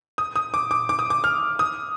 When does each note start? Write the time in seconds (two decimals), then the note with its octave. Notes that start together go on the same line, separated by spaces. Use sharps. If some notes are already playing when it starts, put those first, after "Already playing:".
0.18 D#6
0.36 D#6
0.54 D6
0.71 D6
0.89 D6
0.99 D#6
1.10 D6
1.24 F6
1.59 D#6